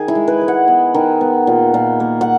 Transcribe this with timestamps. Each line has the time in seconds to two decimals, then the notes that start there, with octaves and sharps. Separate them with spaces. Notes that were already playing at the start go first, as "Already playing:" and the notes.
Already playing: D#3 G#4
0.08 E4
0.15 G#3
0.28 B4
0.41 G#3
0.48 F#5
0.68 B3
0.94 D#3
1.21 B3
1.47 A#2
1.74 A#2
2.00 A#3
2.21 F#5